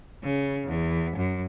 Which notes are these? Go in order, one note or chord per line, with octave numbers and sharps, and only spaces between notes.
C#3
E2
F#2